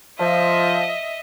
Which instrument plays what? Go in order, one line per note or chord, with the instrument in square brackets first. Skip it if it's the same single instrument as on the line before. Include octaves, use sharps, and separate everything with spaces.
[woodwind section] F3 [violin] D#5 E5